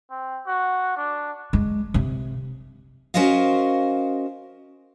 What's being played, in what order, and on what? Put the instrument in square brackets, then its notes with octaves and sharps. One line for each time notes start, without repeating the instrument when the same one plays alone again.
[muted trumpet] C4
F#4
D4
[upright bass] G#3
C3
[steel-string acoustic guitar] C#4 F#4 A#4 C5 D#5 F5